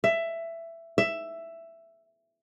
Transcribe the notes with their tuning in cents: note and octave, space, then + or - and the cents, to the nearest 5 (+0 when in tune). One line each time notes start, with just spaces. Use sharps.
E5 +15
E5 +10